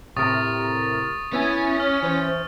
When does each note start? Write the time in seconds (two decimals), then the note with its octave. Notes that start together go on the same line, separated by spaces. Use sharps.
0.16 A2 C3 A#4 C#6 D#6 A6
1.33 B3 C#4 E4 G#5
1.80 C#5 F6
2.02 E3 C5